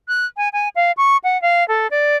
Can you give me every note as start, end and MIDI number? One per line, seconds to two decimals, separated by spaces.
0.08 0.26 90
0.37 0.49 80
0.53 0.69 80
0.76 0.92 77
0.97 1.17 85
1.24 1.40 78
1.42 1.66 77
1.68 1.87 69
1.91 2.17 74